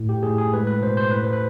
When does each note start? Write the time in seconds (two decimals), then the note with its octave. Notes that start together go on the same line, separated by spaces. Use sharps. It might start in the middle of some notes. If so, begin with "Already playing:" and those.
Already playing: A2
0.09 G4
0.23 A2 G#4
0.38 G#4
0.53 G#3 B4
0.67 B4
0.82 B2 C5
0.97 C5
1.11 A2 B4
1.24 C5
1.33 B4